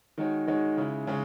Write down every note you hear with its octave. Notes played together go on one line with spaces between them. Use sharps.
D#3 G#3 D#4 F#4 C#5
D#3 G#3 D#4 F#4 C#5
C#3 G#3 C#4 E4
C#3 G#3 C#4